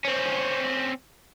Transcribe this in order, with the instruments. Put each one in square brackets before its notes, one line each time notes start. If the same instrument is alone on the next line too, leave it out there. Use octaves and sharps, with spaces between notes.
[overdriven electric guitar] C4 C#4